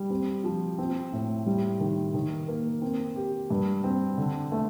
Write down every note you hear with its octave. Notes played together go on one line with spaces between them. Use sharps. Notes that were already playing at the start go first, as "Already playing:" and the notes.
Already playing: G3
C4
F3
C4
A2
G3
D#3
D#3
A#3
C4
G4
G2
C4
D3
A3